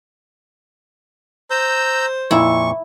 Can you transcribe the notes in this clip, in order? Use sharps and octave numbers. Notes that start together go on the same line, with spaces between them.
C5 A#5 E6 G6
F2 A#2 E4 C#6